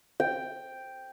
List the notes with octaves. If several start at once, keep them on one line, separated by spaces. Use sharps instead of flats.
G5